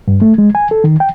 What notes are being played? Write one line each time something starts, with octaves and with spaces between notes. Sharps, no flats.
G2
A3
G#3
G#5
A4
D#3
G5